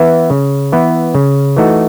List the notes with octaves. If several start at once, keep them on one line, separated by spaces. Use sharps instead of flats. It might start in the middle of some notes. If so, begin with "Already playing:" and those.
Already playing: E3 B3 E4
C#3
E3 B3 E4
C#3
E3 A3 D#4 F#4